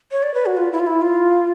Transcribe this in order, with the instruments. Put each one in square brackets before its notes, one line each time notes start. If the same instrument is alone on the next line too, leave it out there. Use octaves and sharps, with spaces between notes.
[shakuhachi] C#5
D5
B4
F#4
F4
E4
F4
E4
F4